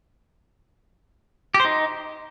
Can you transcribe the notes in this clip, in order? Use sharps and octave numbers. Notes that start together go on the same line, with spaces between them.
G4
C5
D#4